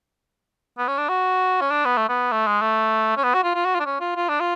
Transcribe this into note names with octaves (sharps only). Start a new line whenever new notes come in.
B3
C#4
D4
F#4
C#4
D4
B3
A3
B3
A3
G#3
A3
C#4
B3
F#4
F4
F4
F#4
F4
D4
C#4
F4
F4
D4
F4